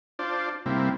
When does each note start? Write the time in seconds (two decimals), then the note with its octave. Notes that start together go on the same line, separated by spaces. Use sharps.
0.19 D4 F4 C5 D5
0.66 C3 G3 A#3 C4 E4